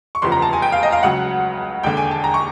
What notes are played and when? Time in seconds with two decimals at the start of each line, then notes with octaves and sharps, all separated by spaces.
0.15 C#6
0.22 F1 E2 C#3 F3 C6
0.32 A#5
0.42 A5
0.53 G#5
0.62 G5
0.72 F5
0.83 D#5
0.92 F5
1.03 C#2 C#3 F#3 F#5
1.83 E1 D#2 D3 G5
1.97 G#5
2.11 A5
2.24 A#5
2.34 C#6